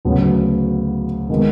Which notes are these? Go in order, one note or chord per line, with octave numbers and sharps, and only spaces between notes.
D2 C#3 F#3 B3
D#3 G#3 B3